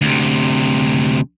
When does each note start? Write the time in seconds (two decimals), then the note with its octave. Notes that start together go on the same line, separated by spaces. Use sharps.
0.01 D2 C3